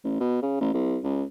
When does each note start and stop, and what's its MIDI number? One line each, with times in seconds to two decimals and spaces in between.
0.04 0.17 33
0.20 0.41 47
0.42 0.56 49
0.61 0.70 33
0.74 0.98 36
1.03 1.24 37